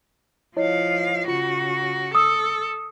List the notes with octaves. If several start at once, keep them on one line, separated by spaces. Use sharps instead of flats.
F3 E4 C#5 D#5 F5
C#3 F4 F#4
A4 D#6 E6